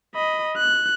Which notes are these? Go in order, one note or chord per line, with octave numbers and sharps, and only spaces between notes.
D#5 B5
F#6